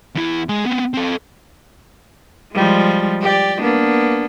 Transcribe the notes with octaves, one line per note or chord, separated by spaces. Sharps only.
E2 E4
G#3 G#4
B3 C4
C4 A4
F3 G3 G#3
G4 D5
A#3 B3 D4